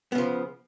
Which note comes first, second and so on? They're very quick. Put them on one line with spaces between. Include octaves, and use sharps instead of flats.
B3 C#3 F3